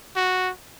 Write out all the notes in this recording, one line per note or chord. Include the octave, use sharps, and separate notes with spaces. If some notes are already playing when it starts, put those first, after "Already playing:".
F#4